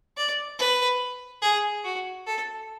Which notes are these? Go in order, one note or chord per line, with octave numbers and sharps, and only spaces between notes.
D5
B4
G#4
F#4
A4